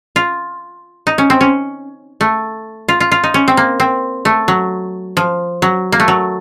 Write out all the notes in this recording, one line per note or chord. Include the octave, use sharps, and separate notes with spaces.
F4
D#4
C#4
C4
C#4
A3
F4
F4
F4
D#4
C#4
C4
A#3
C4
A3
F#3
F3
F#3
A#3
A3
F#3